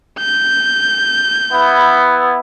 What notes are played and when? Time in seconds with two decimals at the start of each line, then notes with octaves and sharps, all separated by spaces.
0.19 G6
1.52 B3 E4